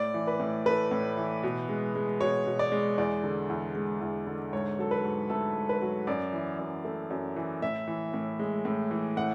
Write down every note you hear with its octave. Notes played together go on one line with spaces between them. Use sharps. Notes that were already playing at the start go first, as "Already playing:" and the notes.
Already playing: A2 D5
E3
B4
A2
A3 B4
A2
E3
B2
G#3
G#3
B2 C#5
B2
D5
G#3
E2 D5
D3
E2
G#3
E2
D3
G#2 C#5
F#3 A4
B4
G#2
A3 A4
G#2
B4
F#3
F#2 D5
E3
F#2
A3
F#2
E3
A2 E5
E3
A2
G#3
A2
E3
A2 F#5